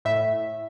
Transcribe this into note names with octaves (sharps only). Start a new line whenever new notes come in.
A2 E5